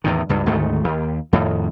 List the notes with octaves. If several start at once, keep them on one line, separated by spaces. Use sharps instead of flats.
E2 A2 D#3
C#2 G2
D2 G#2 D#3 A3
D#2
F2 A2 D#3